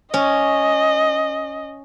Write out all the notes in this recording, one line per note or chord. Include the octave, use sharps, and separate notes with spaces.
C#4 D#5